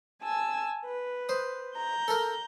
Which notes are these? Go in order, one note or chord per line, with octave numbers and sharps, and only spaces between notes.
G#5 A5 E6
B4
C5 D#6
A#5 G6
A4 A#4